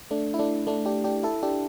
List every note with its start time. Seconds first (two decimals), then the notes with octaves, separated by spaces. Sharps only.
0.11 A3 D4
0.34 E4
0.39 A3 D4
0.67 A3 D4
0.86 D4 G4
1.04 D4 G4
1.23 E4 A4
1.43 D4 G4